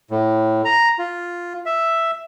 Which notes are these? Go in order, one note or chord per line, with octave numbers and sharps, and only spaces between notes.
A2
A#5
F4
E5